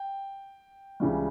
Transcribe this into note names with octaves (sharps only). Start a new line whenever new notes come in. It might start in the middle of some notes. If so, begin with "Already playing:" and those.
Already playing: G5
C#2 C#3 E3 G3